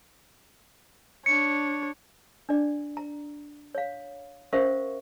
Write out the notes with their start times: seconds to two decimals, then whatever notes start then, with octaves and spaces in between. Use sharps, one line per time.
1.26 D4 C#5 C#7
2.49 D4 D5
2.97 A#5
3.75 C#5 F5
4.53 C#4 A#4 C5 E5 F5 C#6